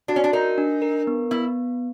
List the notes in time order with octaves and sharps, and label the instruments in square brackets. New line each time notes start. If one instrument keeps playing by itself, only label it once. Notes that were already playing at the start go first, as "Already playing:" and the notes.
[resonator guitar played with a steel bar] D4 [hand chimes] F#4
[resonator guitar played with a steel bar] C#4
D4
[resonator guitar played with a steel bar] D#4 [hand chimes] A#4
[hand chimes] D4
A#4
B3
[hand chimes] B3 [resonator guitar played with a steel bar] E4